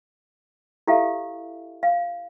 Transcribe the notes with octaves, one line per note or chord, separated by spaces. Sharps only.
E4 G4 A4 E5 F5
F5